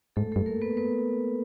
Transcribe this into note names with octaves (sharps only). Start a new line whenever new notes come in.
G#2 A3 A4
G2 A3 A4
A#3 A#4
B3 B4
B3 B4